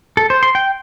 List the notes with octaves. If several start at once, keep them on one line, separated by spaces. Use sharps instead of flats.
A4
C5
C6
G5